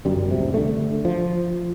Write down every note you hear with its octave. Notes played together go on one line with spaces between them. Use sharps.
G1 F#2 G3
D#1 C#2 C3
D3 A3
F3